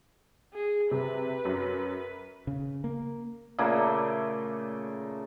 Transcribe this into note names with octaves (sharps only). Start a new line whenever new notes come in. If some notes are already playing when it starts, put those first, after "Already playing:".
G#4
C3 B4
F#2
C#3
A#3
A#2 C#3 A3 A#3